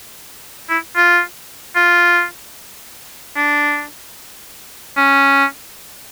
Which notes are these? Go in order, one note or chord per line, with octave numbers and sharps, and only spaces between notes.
E4
F4
F4
D4
C#4